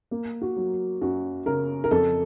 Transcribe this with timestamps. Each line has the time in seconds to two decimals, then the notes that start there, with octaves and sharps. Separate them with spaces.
0.11 A#3
0.42 F#4
0.57 F#3
1.01 F#2 F#4
1.46 C#3 A#4
1.84 A#4
1.91 F2 A4